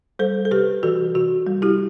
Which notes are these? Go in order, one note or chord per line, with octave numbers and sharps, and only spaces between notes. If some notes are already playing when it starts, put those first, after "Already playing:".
G3 A4 C5
A4
C3 G4 B4
E3 F#4 A4
C3 F#4
G3
E4 G4